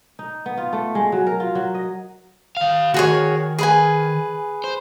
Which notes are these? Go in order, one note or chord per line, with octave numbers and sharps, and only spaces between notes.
D#4
B3
F4
A3
G#3
F#3
A#4
F4
F#3
D#5
D#3 F5
D#3 F#4 G#4 C#5
G#4 B4 G#5
C5